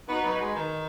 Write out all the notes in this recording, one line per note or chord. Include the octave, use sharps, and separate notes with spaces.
B3 D#4 F#4 B4
F#3
G#3
D#3